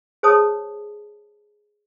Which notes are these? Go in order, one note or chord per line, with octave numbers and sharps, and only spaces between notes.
G#4 C5 C#5 A5 D#6